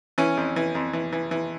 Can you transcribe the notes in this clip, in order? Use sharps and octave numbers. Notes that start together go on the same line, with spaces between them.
E3 C#4
F2
E3
F2
E3
E3
E3